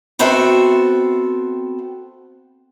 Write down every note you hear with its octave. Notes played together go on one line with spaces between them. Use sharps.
B3 C4 F#4 A4 E5